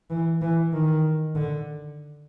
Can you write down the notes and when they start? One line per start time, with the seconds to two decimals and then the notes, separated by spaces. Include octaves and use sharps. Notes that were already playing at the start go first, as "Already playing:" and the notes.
0.10 E3
0.41 E3
0.73 D#3
1.35 D3